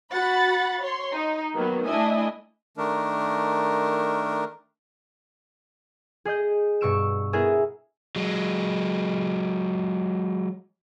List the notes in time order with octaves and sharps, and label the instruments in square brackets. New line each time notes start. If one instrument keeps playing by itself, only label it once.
[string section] F#4 F#5 B5 A6
C#5 C6
D#4
D#3 F#3 A#3 B3
A3 D4 E4 D#5 E5 G#5
[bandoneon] D#3 A3 D4 A#4
[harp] G#4 D#5 D#6 G6
G2 B2 C#6 E6 D7 E7
B3 E4 G#4 A#4 E5 G#5
[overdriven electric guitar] F#3 G#3